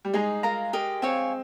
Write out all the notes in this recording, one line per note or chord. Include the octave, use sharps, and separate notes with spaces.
G3
G#3 D#4 G#4 D#5 A#5
F4 A#4 F5 A#5
G4 A#4 D#5
C4 C#5 F5 G#5